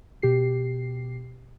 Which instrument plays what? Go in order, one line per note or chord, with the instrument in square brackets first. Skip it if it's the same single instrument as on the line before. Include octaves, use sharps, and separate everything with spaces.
[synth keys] B2 G4 C7